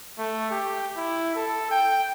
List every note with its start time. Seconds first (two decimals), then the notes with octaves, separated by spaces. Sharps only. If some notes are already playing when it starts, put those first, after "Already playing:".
0.19 A3
0.51 G4
0.97 E4
1.35 A4
1.71 G5